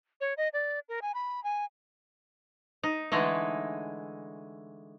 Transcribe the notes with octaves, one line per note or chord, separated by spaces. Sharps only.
C#5
D#5
D5
A#4
G#5
B5
G#5
D#4
D3 E3 G#3 A3 D#4